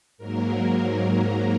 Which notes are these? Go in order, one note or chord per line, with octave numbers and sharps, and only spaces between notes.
G#2 F#3 A#3 A#4